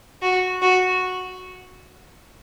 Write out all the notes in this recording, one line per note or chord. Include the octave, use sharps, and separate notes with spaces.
F#4
F#4